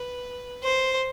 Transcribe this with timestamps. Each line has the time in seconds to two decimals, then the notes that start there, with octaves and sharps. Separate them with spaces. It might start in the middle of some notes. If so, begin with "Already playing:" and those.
Already playing: B4
0.63 C5